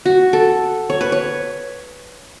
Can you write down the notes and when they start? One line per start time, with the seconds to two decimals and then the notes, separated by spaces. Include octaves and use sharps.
0.06 F#4
0.33 A4
0.90 C#5
1.01 B4
1.12 C#5